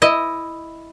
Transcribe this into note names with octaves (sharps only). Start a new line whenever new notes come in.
E4 D#5